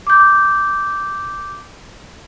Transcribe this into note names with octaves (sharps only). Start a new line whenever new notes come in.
D6 G6